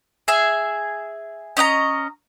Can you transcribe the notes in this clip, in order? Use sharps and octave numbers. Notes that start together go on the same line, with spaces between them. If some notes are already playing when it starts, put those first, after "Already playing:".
G#4 E5 G#5
C#4 D#5 G5 A#5